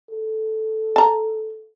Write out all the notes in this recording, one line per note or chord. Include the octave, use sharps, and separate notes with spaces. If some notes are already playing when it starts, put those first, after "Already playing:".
A4
A5 A#5